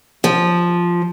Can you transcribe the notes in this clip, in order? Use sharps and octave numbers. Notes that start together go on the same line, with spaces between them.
F3